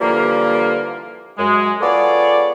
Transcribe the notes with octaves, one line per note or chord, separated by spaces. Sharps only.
D3 E3 F3 G3 A#3
F#2 G#3
B3 F4 G#4 A4 C#5 D5